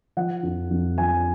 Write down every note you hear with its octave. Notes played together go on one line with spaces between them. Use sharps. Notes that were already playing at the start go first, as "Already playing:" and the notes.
F3 F#5
F2
F2
F3 G#5